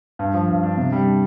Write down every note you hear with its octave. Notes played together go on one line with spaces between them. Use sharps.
G2
F3
G2
D4
C3
G3
D4